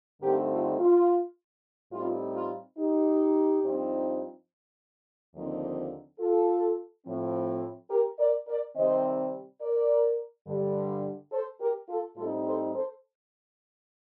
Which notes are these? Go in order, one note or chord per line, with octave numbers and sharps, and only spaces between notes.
G2 D3 A3 C4 D#4 G4 A#4
F4 A4
F4
A2 G3 C4 D#4 F4
F4
D#4 G4
G2 F3 C4 D#4
D#2 D3 F3 C4 D#4
F4 A4
A2 F3 C4
G4 A#4
A#4 D5
A#4 D5
C3 D#3 G3 C4 C5 D#5
A#4 D5
G2 D3 G3
A4 C5
G4 A#4
F4 A4
A2 G3 C4 D#4 F4 A4
A4 C5
A4 C5